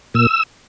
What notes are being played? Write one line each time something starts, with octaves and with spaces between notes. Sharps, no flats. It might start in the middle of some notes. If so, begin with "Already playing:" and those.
A#2 E6